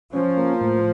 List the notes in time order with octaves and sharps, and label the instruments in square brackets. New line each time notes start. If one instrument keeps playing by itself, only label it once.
[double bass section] F3 [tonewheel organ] C#4
[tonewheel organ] A#3
A2